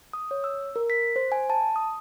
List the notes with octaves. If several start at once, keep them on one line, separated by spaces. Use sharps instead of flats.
D#6
C#5
E6
A#4
B6
C5
G#5
A5
D#6